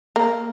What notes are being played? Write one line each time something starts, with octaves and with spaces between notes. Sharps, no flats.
A#3